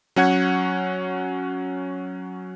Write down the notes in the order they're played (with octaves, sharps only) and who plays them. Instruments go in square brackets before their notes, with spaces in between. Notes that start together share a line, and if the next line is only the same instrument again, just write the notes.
[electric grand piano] F#3 C#4 F#5 G#6